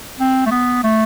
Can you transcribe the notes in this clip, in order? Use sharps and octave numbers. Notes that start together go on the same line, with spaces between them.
C4
A3
B3
A3